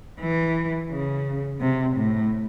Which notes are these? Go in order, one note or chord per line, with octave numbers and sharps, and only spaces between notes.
E3
C#3
C3
A2